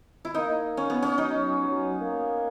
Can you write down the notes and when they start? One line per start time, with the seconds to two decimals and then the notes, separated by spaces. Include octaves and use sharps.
0.25 E4
0.34 A#3 D#4
0.77 C#4
0.90 B3
1.03 C#4
1.18 F#3 D#4
1.60 F#3
2.02 A#3